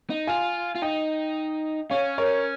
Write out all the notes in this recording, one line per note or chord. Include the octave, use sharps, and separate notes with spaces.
D#4
F4 F5 G#5
F4
D#4 D#5 G5
C#4 C#5 F5
A#4 C#5